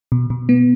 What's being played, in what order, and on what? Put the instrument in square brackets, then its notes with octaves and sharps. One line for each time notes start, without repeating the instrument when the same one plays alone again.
[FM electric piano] B2
B2
B3